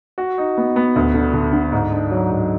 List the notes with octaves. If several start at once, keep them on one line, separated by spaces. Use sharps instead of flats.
F#4
D#4
B3
B3
D2
D3
D3
D3
G#2
D4
F#3
G#2